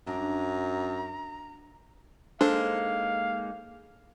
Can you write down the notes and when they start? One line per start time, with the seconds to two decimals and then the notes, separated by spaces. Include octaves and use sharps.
0.07 F#2 D4 A#5
2.41 G#3 A#3 D4 D#4 A4 C5 F5